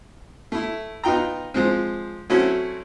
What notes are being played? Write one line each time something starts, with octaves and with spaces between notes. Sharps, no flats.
A3 E4
B3 D#4 F4 G5 A#5
F3 G#3 C4
F#3 A3 C4 C#4 E4 F#4